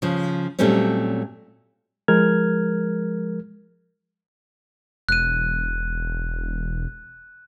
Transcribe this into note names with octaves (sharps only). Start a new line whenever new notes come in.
C#3 F3
A#2 F#3 G3 A3 C4 C#4
F3 G#3 A#4 F6 G#6
E1 F#6 D#7